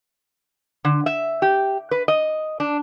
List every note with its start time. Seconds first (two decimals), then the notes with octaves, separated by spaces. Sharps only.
0.85 D3
1.06 E5
1.42 G4
1.91 B4
2.08 D#5
2.60 D4